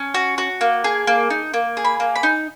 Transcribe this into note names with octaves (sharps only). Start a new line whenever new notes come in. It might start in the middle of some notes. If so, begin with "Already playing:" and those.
Already playing: C#4
F#4
F#4
A#3
G#4
A#3
D#4
A#3
G#4
B5
A#3
B5
D#4